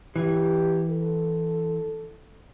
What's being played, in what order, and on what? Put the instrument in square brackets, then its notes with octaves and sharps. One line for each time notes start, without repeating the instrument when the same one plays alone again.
[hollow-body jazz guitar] E3 [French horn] G4
[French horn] A4